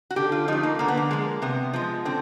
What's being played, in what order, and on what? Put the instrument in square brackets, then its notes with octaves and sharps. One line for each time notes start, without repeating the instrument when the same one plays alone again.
[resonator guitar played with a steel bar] F#4
D3 G4
F4
F3 A3 D#4
A#3
D3 A#3
B3
A#3
F3 G#3
C3 B3
F3 G#3
D3 C4